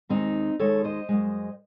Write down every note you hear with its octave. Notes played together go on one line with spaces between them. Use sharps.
D#2 D#3 G#3 C4 D#4
D#2 D#3 G#3 A4 C#5
C5 D#5
F#2 C#3 G#3